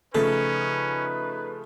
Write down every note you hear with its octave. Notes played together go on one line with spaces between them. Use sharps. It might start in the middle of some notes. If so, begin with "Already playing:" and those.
C#3 F3 A3 C#4 D#4 A4 B4